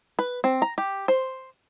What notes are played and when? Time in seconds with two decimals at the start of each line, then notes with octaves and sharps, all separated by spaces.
0.19 B4
0.44 C4
0.62 A#5
0.78 G4
1.08 C5